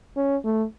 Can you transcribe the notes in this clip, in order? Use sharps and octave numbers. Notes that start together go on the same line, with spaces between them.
C#4
A3